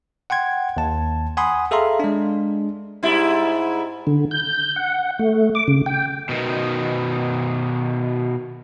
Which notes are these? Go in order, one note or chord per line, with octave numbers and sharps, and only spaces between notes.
F#5 G5 C6 G#6
D#2 A5
F#5 G#5 B5 C6 D#6
G#4 A4 E5 F5 A#5 C6
G#3 D4
G#2 G3 E4
D3
G6
F#5
A3
D6
C#3
G5
B2 D#3